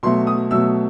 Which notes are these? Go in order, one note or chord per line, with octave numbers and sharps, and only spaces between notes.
B2 F#3 A3 C6
D#6
B2 F#3 A3 E6